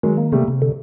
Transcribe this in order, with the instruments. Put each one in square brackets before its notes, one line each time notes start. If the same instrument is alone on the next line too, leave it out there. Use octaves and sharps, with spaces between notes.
[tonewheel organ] D#3 [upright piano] F#3 G#3
[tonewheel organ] A#3
[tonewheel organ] C3 [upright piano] G3 A3
[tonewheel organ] C3
D3